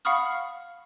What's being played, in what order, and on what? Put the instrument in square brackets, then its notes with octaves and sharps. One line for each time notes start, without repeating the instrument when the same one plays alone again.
[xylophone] F5 F#5 B5 C#6 D#6 F6